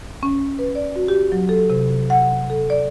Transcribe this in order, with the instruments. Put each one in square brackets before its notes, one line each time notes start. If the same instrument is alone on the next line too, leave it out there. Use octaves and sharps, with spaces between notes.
[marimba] C#4
B4
D5
F#4
G4
F#3
A4
C3
F#5
A4
D5